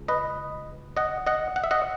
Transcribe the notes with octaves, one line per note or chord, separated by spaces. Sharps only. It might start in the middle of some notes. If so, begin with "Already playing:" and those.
Already playing: C#2
B4 D#5
D#5 F#5
D#5 F#5
F#5
E5
D#5 F#5